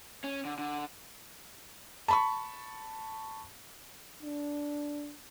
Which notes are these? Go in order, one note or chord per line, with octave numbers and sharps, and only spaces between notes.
C#4
D3
D3
A5 B5 C#6
D4